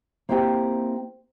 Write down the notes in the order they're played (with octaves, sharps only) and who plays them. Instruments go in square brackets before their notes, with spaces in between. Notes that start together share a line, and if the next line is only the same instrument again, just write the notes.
[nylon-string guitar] A#3 C4 E4 G4 G5